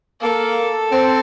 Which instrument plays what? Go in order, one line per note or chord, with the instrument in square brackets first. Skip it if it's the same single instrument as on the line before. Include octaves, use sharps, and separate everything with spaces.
[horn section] A#3 [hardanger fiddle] A4
[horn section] C4